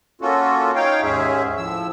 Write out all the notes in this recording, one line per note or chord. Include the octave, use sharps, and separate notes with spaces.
A#3 C#4 F4 F#4 A4
D#4 C#5 F5 G5
D#2 G#2 G#3 C#4 G#4 E5
A2 F3 E6